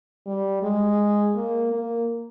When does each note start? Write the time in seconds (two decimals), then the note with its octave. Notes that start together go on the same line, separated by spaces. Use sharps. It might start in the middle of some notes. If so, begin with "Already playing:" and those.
0.26 G3
0.63 G#3
1.35 A#3
1.72 A#3